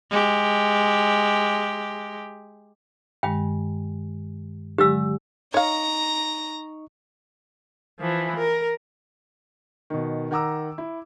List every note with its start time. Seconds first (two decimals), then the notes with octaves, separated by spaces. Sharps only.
0.10 G#3 G4
3.23 G2 D#3 G#3 G5
4.78 D3 F#3 G#3 G4 E6
5.54 D#4 C#5 D#5 F5 A#5 C#6 A#6
8.00 E3 F3
8.36 A#4
9.90 B2 D#3
10.31 D#3 F#5 A#5 D6 E6
10.78 E4